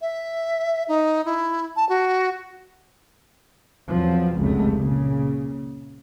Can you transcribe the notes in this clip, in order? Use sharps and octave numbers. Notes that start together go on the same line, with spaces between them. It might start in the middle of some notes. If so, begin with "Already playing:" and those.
E5
D#4
E4
A5
F#4
E2 F3 F#3 C4
F1 C#2 F#2 G#3 A3
A#2 C#3